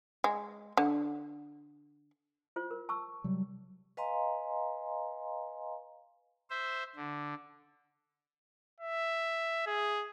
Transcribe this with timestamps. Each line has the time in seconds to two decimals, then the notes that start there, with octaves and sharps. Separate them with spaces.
0.24 G#3
0.77 D3
2.56 F4 C5
2.71 A#4
2.89 A5 C#6 E6
3.24 C3 F#3 G3
3.97 B4 D#5 F5 G#5 A#5 C6
6.50 C5 E5
6.96 D3
8.80 E5
9.67 G#4